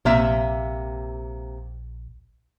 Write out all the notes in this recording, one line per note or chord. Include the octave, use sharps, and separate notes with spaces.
A#1 C3 A#3 E5